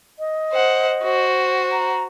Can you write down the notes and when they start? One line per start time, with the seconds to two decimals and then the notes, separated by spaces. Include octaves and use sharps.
0.19 D#5
0.53 C5 F#5
1.04 F#4 C5
1.72 A#5